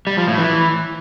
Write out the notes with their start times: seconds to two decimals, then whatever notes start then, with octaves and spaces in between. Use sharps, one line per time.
0.07 G3
0.17 F3
0.28 A2
0.38 E3